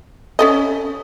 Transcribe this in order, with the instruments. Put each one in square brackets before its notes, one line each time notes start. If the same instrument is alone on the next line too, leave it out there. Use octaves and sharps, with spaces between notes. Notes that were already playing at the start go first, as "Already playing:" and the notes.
[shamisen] C#4 A4 D#5